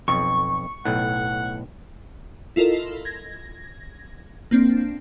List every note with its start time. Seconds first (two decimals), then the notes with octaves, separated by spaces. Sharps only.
0.08 B1 F2 C#6
0.85 B1 A2 F#5
2.56 E4 F4 A4 A#4 D#5
3.05 G#6 A#6
4.51 A#3 C4 D4